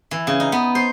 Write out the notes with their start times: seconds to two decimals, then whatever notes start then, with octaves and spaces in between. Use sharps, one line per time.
0.11 E3
0.27 C#3
0.40 D#4
0.52 B3
0.75 C5